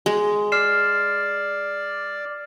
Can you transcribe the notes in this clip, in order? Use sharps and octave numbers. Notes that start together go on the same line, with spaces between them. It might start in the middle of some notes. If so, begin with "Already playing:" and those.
G#3
D5 F6 C7 E7